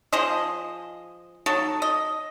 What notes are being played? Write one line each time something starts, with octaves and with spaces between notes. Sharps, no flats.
F3 G#4 C5 D#5
F#3 D#4 A4 C#5
D#5